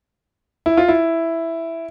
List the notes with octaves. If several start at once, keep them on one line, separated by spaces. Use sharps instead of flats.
E4
F4
E4